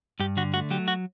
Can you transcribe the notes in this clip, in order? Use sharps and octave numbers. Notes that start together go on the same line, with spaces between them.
G2 G4
D3 F#4
A3 F#4
F#3 G4
F#4